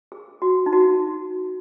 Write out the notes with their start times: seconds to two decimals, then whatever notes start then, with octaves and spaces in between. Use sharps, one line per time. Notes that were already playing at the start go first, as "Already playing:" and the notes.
0.12 G#4
0.42 F#4
0.66 D#4
0.73 F#4